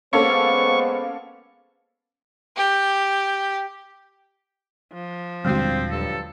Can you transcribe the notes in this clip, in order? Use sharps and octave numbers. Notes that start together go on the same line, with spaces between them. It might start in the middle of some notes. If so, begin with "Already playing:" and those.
G#3 A#3 B3 C#4 A4 C5 C#6
G4
F3
D#1 D3 G3 G#3 C4 F#4
G2 F#3 A4